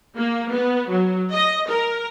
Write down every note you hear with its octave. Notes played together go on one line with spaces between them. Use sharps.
A#3
B3
F#3
D#5
A#4